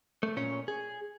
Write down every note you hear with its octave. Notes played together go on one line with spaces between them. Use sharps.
A3
A#2 C#4 C#5
G#4